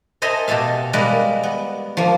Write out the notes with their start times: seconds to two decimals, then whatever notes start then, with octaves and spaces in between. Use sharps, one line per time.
0.22 A4 C5 D#5 E5 G#5 A#5
0.48 B2 G4 A4 E5 F5
0.93 G3 G#3 A#3 A#4 B4 D5
1.43 B3
1.97 F3 A#3